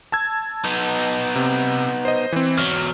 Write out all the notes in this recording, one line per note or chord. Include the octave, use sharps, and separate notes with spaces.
A5 E6 G#6
B3 D#4
C3
C5 D#5
E3 C4
E2 F#3 F6